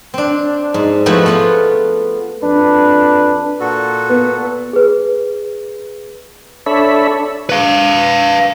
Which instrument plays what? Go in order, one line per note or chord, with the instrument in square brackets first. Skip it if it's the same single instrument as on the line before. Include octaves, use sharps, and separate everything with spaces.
[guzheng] C4 D4
G#2
F3 A3 B3 C4 E4 F#4
B3 F4 F#5
[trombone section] F2 D4 B4
[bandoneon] A#2 F#4 A4
[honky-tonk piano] B3
[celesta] G#4 B4
[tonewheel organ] D4 A4 C#5 E5 B5
[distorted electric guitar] B4 F5